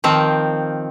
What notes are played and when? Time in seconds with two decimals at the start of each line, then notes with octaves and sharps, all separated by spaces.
0.04 D#3 F3 C4